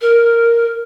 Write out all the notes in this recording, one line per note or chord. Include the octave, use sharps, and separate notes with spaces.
A#4